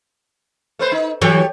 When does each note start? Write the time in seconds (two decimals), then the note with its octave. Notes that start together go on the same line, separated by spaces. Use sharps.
0.79 A3 B4 C5
0.92 D#4
1.22 E3 F#3 G4 A4 C#5